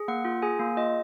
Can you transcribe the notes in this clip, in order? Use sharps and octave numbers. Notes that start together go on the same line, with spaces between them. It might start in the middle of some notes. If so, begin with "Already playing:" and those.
Already playing: G#4
A#3 F#5
F4
G#4 G#5
A#3
F4 D#5